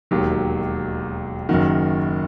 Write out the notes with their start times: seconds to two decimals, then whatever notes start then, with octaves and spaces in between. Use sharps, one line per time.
0.11 E1 D#2 D#3 F#3 G4
1.49 F#1 F#2 D#3 F#4